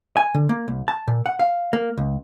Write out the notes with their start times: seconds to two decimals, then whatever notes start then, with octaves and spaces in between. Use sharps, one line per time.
0.17 G#5
0.35 D3
0.49 A#3
0.68 C2
0.88 A5
1.08 A#2
1.26 F#5
1.39 F5
1.73 A#3
1.97 C#2